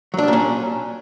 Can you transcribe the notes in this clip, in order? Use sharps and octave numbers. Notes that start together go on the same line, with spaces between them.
A#2 F#3 G3 C#4 D4